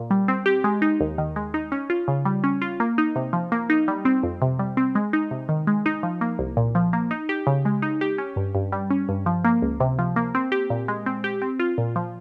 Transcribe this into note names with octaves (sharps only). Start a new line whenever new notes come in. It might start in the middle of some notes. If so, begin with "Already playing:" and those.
Already playing: A#2
G3
C4
G4
G#3
D#4
D#2
D#3
G#3
D#4
C#4
F4
C#3
G3
C#4
F4
A#3
D#4
C3
F3
A#3
D#4
G3
C4
F2
C3
G3
C4
G#3
D#4
C3
D#3
G#3
D#4
F3
A#3
C2
A#2
F3
A#3
D#4
G4
C#3
G#3
D#4
G4
C#4
G2
G2
G3
C#4
G2
F3
A#3
C#2
C3
F3
A#3
C4
G4
A#2
G#3
C4
G4
C4
F4
A#2
F3